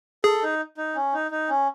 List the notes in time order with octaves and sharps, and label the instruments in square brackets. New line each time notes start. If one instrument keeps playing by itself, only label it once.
[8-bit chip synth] G#4 [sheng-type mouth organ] A4
[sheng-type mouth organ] D#4
D#4
C#4
D#4
D#4
C#4